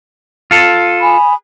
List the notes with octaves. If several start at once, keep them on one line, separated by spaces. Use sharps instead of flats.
F4 A4
G#5 B5 D#6